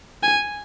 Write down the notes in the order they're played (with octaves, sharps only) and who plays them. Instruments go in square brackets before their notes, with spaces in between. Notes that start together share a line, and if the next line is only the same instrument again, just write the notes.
[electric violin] G#5